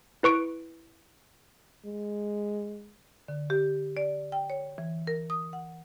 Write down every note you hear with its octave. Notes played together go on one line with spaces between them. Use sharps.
E4 B4 C#6 D7
G#3
D3
G4
D5
G5
C#5
E3
A#4
D#6
F#5